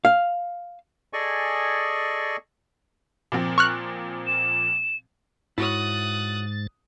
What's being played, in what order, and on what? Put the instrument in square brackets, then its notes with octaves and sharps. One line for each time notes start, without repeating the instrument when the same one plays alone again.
[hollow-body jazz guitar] F5
[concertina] G#4 A4 D5 D#5 G#5 C#6
[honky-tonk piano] A#2 F3 C4
[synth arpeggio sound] C#6 F6 F#6
[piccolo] E7
[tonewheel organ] G#2 A6 [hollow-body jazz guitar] E4 F#4 C#5 [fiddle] D#6 F#6